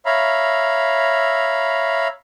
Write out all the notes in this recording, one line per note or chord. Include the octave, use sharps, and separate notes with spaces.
C#5 E5 F5 A#5 B5